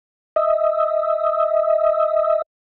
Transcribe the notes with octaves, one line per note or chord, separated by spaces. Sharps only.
D#5 E5